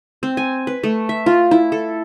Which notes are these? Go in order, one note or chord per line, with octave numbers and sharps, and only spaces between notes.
C4
G#5
B4
A3
E5
F4
E4
A4